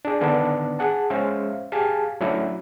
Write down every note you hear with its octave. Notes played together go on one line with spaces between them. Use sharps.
D4 G#4
D3 D#3 B3 D4
G#4 F#5 A5
G#3 C#4 C5 E5 F5
G4 G#4 F5 G#5 A5
F#3 A3 C#4 D4 E4